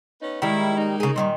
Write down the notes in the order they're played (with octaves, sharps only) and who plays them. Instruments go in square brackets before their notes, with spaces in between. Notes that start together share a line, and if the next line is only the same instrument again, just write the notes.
[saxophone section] B3 C#4 D#4
[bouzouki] D#3 G3 [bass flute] G#3 [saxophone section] E4
[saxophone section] A#3 D#4
[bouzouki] C#3 G#4
[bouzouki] A#2 D3 D#3 [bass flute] G3